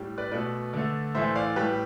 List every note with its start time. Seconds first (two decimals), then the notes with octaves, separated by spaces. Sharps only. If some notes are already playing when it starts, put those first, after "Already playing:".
Already playing: A2 G3
0.18 B4 D5
0.31 B2 A3 B4 D5
0.73 D3 A3
1.15 A2 E3 A3 C5 E5
1.35 D5 F5
1.56 A2 G3 G4 B4